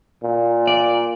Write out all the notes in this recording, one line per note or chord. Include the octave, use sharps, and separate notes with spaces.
A#2
D5